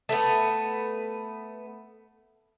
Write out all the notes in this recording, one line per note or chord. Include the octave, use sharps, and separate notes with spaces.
A3 B3